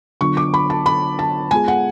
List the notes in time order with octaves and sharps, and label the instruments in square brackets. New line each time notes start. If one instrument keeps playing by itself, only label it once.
[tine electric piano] D3 F#3 B3 D4 F4 [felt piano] C#6
[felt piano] D6
B5
A5
B5
A5
[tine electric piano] G#3 B3 F4 G#4 [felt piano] G#5
[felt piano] F#5